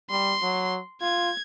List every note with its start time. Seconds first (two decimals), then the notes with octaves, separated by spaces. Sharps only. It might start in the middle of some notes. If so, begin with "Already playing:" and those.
0.10 G3 C6
0.42 F#3
1.01 F4 G#6